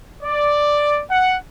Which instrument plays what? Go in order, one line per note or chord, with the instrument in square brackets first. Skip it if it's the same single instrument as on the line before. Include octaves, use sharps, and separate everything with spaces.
[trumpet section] D5
F#5